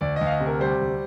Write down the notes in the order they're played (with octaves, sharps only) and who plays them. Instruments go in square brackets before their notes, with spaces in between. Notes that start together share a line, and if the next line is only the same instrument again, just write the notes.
[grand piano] D2 D5
D2 D#5
F5
D#5
C3
A#4
G3 C5
D2